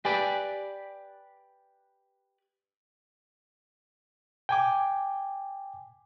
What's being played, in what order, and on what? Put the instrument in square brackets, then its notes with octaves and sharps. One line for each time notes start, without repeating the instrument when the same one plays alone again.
[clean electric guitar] G4 B4 D5 [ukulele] G#5
[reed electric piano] G5 G#5 D6